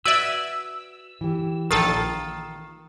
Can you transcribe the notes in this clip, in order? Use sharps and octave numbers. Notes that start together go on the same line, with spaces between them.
F#4 B4 D5 E5 E6 G#6
E3 G4
A#1 D#3 F4 A4 A#4 A6